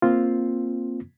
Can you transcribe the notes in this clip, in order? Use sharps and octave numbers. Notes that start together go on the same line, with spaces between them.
A#3 C4 F4